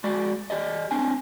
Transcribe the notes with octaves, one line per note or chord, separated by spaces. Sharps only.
G#3 F#4 D5
G4 D5 D#5
C4 D4 G#5